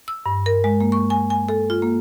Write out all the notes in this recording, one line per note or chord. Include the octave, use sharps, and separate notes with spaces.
E6
G2
A#4
G#3
A#3
C#6
G#5
G#5
A4
F4
A#3